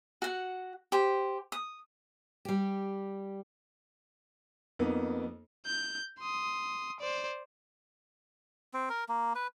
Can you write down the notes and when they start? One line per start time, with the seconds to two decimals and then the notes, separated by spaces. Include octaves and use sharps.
0.22 F#4 F#5
0.92 G4 C5
1.52 D#6
2.45 G3 G4
4.79 F2 A#3 B3 D#4
5.66 G6
6.20 C6 D#6
7.00 C5 D5
8.74 C4
8.90 A#4
9.09 A#3
9.35 B4